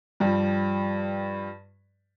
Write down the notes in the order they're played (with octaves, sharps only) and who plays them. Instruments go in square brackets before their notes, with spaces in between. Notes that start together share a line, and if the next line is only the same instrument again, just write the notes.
[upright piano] G2 F3 G3